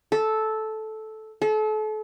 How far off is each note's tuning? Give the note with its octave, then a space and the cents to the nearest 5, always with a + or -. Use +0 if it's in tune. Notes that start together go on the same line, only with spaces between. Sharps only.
A4 -10
A4 -35